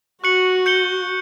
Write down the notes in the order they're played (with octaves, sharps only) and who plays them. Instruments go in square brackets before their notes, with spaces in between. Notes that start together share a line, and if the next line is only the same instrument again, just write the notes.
[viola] F#4 [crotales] C#6 F#6 C#7 F#7
[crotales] G6 C#7 G7